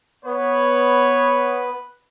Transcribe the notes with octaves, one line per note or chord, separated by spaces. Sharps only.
B3 B4 C#5